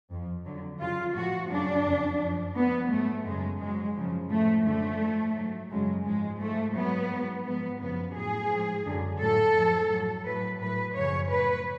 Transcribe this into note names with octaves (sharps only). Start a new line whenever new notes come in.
F2 F3
F2 D3 F#3
F2 C#3 F#3 F4
A2 F3 F#4
F#2 C#3 F#3 D4
F2 C#3 F#3
F#2 F3
A2 F3 B3
G#2 F#3 A3
F#2 C#3 F#3 G#3
G#2 F#3 G#3
F#2 C#3 F3
A2 F3 A3
F#2 D3 F3 A3
G#2 F3
G#2 F#3
F#2 C#3 F#3 G#3
G#2 F3 G#3
G#2 F3 A3
G#2 F#3 B3
G#2 F#3
G#2 F3 B3
F#2 C#3 F3 B3
A2 F#3 G#4
G#2 F3
F#2 D3 F#3
A2 F#3 A4
F#2 F3
A2 F#3
A2 F#3 B4
A2 F#3 B4
F#2 C#3 F3 C#5
A2 F#3 B4